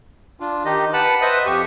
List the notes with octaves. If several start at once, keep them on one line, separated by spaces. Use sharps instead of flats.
D4 F4
D#3 D#4 G4 D#5
B4 F#5 A5 B5 F#6
B4 C5 D#5 E5 D#6
F2 G4 C#6